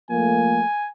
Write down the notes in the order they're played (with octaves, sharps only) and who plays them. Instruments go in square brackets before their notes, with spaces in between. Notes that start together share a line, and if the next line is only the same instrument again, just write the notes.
[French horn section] F3 A3 A#3 [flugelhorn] G#5